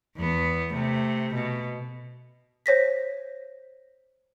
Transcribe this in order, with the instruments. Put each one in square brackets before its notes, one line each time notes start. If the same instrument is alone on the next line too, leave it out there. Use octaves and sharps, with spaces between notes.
[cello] E2 B3
C3 A3
B2
[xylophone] C5 C#5 A#6 B6